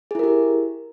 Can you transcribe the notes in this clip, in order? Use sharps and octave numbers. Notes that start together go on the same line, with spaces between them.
E4 G4 G#4 A#4